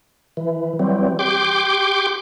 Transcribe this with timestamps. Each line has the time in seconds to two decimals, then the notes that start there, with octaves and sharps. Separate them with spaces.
0.37 E3
0.80 E3 F#3 G3 C4
1.19 G4 G5 C6 D6